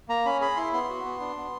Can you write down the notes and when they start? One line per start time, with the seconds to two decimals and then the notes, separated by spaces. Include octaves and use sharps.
0.09 A#3 A#5
0.25 C#4 B5
0.41 G#4 B5
0.56 E4 C6
0.73 B3 C6
0.89 F#4
1.05 B3
1.20 D4
1.37 B3